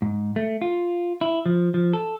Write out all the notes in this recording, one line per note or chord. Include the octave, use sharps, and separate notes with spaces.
G#2
A3
F4
E4
F3
F3
A4